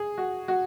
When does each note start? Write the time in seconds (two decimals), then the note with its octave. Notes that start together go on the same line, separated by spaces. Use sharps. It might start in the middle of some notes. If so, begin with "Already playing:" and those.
Already playing: G#4
0.18 F#4
0.48 F#4